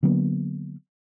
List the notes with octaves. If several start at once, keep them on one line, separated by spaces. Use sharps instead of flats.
D3 F#3 A#3 B3